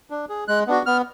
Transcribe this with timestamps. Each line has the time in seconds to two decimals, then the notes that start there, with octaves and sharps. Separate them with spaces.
0.10 D4
0.29 G#4
0.48 G#3 F#6
0.67 B3 D4 F#4
0.86 B3 F6